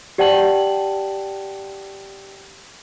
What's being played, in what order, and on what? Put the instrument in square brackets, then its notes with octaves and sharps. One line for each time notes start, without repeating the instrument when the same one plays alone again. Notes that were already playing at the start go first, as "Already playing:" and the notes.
[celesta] G4 D5 F#5 G5 A5 F#7